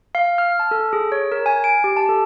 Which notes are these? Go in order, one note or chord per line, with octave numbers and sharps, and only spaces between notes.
F5
F6
A5
A4
G#4
C#5
A#4
G#5
D7
G4
A5
A4